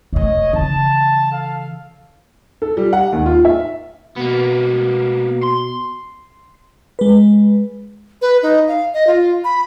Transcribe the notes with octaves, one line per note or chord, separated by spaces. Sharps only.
E1 A3 C#5 D#5
C#3 E3 A5
A4 F5
A4
G3
F#5
D#2
F4
E5
B2 A#3 B3
C6
G#3 B4
B4
D#4
F5
D#5
F4
B5